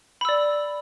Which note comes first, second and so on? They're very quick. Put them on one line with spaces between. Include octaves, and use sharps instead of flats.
B5 E6 D5